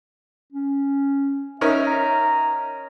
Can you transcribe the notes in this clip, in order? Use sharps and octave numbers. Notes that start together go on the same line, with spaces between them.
C#4
C#4 D#4 A#4 E5
A#5